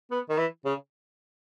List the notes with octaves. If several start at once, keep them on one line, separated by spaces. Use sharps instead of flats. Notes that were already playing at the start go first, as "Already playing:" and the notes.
B3
D#3
E3
C#3